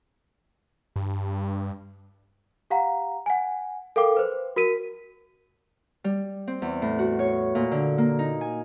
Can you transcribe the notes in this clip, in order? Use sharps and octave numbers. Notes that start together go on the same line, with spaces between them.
G2
G4 F5 F#5 A#5
F#5 G#5
A4 A#4 F5 G5 D6
B4 C5
F#4 A#4 B6 D#7
G3
C4
E2
A2
F#4
C#5
A#2
D3
A#3
D#4
G#5